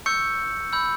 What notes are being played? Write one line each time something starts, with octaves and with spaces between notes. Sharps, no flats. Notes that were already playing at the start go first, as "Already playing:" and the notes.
C#6 E6 G6 C#7
B5 E6 G6